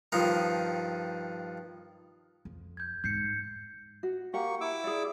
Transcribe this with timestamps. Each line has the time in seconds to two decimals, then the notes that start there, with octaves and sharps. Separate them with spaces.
0.12 G2 D#3 F3 D#4
2.45 F2
2.77 G6 G#6
3.04 G#2 G6 C7 C#7
4.03 F#4
4.34 A#3 G4 F#5 C#6
4.61 E4 D6 E6
4.84 G#4 D5